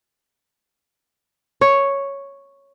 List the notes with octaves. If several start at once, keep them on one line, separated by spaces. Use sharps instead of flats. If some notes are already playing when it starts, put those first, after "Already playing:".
C#5